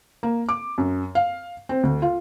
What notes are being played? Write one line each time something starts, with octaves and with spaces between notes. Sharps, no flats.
A#3
D6
F#2
F5
C4
D2
F4